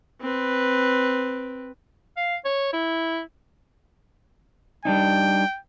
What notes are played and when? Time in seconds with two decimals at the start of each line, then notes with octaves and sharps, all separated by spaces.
0.21 C4 B4
2.17 F5
2.45 C#5
2.73 E4
4.85 G3 D4 D#4 G5